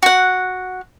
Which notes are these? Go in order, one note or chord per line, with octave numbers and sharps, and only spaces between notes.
F#4 F#5